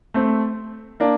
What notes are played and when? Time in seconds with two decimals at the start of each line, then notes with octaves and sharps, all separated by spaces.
0.14 A3 C4
1.00 A#3 D4